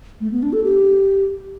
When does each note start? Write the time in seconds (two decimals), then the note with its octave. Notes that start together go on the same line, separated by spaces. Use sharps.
0.20 A3
0.32 B3
0.43 D4
0.53 A4
0.64 G4